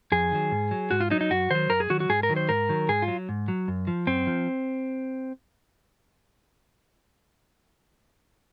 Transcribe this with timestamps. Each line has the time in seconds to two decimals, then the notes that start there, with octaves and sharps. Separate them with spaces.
0.12 F2 G#4
0.32 D#3 F#3
0.52 G#2
0.71 F#3
0.91 G#2 F#4
1.00 F4
1.11 F#3 D#4
1.21 D#4
1.30 F#2 F#4
1.51 D#3 F#3 C5
1.70 F#2 A#4
1.80 G#4
1.90 D#3 F#3 F#4
2.00 F#4
2.09 G#2 G#4
2.23 A#4
2.29 D#3 F#3
2.36 C5
2.49 G#2 A#4
2.69 D#3 F#3
2.89 G#2 G#4
3.02 F4
3.08 F#3
3.29 G#2
3.48 F#3
3.68 F#2
3.87 F3
4.07 F#2 C4
4.27 F3